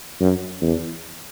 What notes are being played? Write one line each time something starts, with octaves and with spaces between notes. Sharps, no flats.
F#2
E2